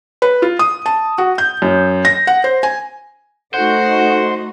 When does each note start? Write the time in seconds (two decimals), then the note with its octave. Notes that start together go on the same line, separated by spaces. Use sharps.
0.22 B4
0.42 F4
0.59 D#6
0.86 A5
1.18 F#4
1.38 G6
1.62 F#2
2.05 A#6
2.27 F#5
2.44 C5
2.63 G#5
3.54 A3 D#4 F#4 A4 C5 F#5